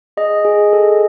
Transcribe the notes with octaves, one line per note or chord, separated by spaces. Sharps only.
G#4 D#5
G#4
A4